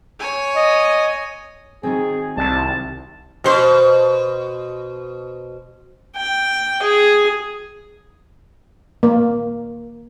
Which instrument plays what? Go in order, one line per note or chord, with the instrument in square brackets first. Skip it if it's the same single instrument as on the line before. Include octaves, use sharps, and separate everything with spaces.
[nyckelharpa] C#5 G#5
[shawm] D#5
[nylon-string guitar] D#3 F#3 C4 [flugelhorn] G#4
[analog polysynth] C2 [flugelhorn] A5
[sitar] B2 C5
[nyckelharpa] G5
G#4
[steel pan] A#3